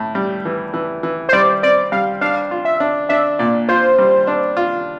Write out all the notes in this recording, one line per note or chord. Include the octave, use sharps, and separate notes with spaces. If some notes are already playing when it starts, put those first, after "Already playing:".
Already playing: A2
G3
E3
E3
E3
C5
G3 D5
C4 D5
G3 F5
D4 F5
F4
E5
D4
D4 E5
A#2 D5
F4 C5
G3
D4
F4